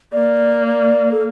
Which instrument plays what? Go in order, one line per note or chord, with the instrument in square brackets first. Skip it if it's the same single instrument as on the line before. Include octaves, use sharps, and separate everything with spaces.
[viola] A#3 [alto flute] D5
[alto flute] D5
A4